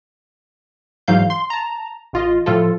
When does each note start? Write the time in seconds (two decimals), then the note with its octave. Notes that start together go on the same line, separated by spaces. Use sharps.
1.08 G#2 E3 F#3 F5 G6
1.30 C6
1.50 A5 A#5
2.13 A1 F4 D#5
2.46 A2 F3 F4 A4